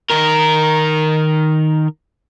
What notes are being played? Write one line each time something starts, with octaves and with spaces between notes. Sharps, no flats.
D#3 A#4